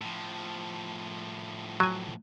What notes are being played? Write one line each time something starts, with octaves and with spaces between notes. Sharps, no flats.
A2 F3
F#3 G#5